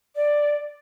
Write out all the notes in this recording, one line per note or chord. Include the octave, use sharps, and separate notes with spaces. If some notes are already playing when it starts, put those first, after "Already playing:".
D5